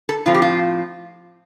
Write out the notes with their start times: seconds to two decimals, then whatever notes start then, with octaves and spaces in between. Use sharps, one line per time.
0.09 A4
0.26 A2 F3 C4 F4
0.34 G4
0.42 F4